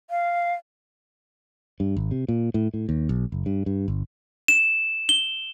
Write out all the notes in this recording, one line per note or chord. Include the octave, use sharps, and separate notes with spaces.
F5
G2
G#1
C3
A#2
A2
A2
D#2
B1
F#1
G2
G2
G1
E7
G7